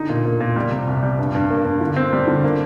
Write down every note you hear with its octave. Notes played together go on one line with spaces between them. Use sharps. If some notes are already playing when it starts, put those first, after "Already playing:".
Already playing: D3 D#4
A#2
A#2
A#2
G3
C3
C2
G3
G2
G2
A#3
G2
D3
C4
G3
D3
A#3